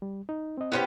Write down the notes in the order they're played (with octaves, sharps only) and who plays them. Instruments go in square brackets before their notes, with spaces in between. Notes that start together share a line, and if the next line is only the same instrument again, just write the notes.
[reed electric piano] G3
D#4
C4 D#5
[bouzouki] B3 C#4 G4 [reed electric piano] E4 B4 C5